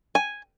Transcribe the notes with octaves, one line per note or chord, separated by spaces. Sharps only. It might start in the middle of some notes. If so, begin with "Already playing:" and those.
G#5